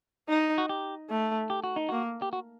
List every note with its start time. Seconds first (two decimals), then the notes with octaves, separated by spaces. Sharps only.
0.28 D#4
0.58 F#4
0.69 G4
1.10 A3
1.50 G4
1.64 F#4
1.76 D#4
1.89 A#3 F#4
2.22 G4
2.33 F#4